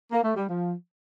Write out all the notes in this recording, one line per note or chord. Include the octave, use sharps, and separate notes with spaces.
A#3
A3
G3
F3